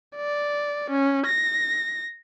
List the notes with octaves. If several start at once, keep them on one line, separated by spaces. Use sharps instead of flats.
D5
C#4
A#6